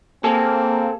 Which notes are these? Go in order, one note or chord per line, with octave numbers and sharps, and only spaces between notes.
A#3 C4 G#4 A4